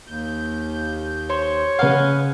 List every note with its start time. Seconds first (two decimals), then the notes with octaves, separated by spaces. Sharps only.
0.07 D#2 G6
1.30 C5 C#5
1.79 C#3 B4 D#5 F5 F#5